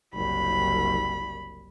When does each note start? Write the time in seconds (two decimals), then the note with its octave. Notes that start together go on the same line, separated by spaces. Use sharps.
0.15 F#1 C2 B5